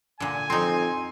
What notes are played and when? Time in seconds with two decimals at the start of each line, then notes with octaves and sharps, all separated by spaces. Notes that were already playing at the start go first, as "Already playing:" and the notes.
0.20 A#2 D3 G#5
0.50 F2 C4 D#4 C6